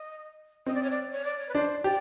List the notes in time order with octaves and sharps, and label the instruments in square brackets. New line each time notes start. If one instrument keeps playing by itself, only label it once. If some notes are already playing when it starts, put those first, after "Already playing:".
Already playing: [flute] D#5
[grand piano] C4 [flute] D#5
[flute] D5
C#5
D5
C#5
D5
C#5
B4
[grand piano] D4 [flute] C5
[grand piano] G4 [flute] D5